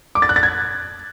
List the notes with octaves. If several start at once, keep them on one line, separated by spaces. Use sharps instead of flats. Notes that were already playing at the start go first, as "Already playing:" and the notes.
D6
A6
F#6
A6
G#6